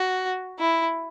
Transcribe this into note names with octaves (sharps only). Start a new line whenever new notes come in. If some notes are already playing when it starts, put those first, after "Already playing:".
Already playing: F#4
E4